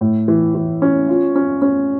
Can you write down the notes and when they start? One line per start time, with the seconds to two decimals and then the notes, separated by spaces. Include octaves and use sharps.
0.01 A2
0.28 E3
0.55 E3
0.82 C#4
1.09 F4
1.36 C#4
1.62 C#4